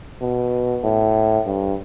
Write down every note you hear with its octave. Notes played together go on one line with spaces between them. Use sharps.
B2
A2
G2